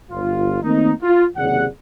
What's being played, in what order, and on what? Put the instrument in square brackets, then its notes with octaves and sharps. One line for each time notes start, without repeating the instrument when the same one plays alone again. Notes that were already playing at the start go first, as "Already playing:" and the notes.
[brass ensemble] G1 F4
D#3 A3 A#3 C4 D#4
F4
F#1 D#2 C3 G#4 D5 F#5